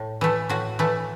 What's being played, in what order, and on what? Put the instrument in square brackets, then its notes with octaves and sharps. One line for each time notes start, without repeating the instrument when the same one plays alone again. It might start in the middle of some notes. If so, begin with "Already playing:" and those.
Already playing: [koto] A2
E3 A3
A2 F#4
E3 A3